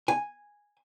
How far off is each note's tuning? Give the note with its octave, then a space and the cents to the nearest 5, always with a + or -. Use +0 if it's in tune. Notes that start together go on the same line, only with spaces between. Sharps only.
G#5 -5